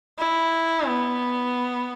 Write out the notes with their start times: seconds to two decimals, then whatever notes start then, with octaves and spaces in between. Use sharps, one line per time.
0.19 E4
0.88 B3